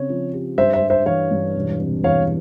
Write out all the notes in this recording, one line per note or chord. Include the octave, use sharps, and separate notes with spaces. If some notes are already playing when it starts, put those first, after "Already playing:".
Already playing: C#3 C4 C#5
F3
G4
G2 C5 E5
C5 E5
G3
C5 E5
E3 C#5 F5
G2
E1
C3
E2 C#5 F5